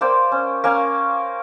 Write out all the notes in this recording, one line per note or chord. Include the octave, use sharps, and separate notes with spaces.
A#3 C5 D5 G5
C#4
A#3 C#4 F5